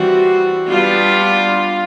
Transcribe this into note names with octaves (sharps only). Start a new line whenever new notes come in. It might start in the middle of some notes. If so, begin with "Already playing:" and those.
Already playing: E3 G3 C4 F#4
G3 B3 D4 F4